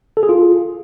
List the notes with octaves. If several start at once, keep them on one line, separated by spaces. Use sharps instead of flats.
A4
G#4
F4